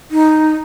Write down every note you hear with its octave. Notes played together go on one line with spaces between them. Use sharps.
D#4